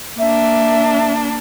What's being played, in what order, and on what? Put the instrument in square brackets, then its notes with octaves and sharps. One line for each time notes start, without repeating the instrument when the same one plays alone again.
[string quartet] A#3 D4 [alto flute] E5